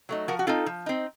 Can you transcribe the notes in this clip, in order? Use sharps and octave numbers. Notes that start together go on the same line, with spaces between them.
F#3 A3 D#4
F3 F#4 A#4
F#4
C4 D#4 F4 A4
F3
C4 D#4